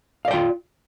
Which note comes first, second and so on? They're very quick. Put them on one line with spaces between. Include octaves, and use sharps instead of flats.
F5 D5 G5 F4